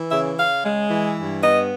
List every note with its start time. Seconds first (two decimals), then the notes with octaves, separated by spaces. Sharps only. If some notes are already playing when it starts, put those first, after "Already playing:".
Already playing: E3
0.11 C#3 E5
0.38 C#3 F5
0.64 G#3
0.90 E3
1.17 G2
1.43 B3 D#5